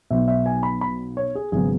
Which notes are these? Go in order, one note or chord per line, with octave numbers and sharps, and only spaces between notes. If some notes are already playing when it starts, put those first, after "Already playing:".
B1 B2 F#3 B3 E5
E5
G#5
B5
B5
C#5
G#4
G#1 C#3 F#3 B3 G#4